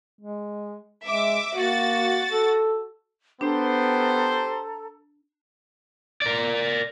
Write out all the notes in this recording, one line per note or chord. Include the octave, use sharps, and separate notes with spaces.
G#3
G#3 E5 D6
A#3 F#4 A6
A4
B3 D4 G4 A4 C5 A#5
A#4 D5